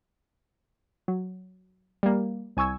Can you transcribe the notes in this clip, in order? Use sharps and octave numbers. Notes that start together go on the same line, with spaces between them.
F#3
G3 A#3
C2 G#5 C#6 E6 G#6